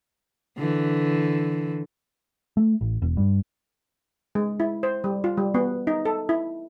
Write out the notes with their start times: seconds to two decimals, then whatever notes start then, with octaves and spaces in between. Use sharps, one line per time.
0.58 D3 E3
2.57 A3
2.81 A1
3.02 E1
3.17 G2
4.35 G#3
4.60 E4
4.83 C5
5.04 G3
5.24 F4
5.37 G3
5.54 B3
5.87 D#4
6.05 A4
6.29 E4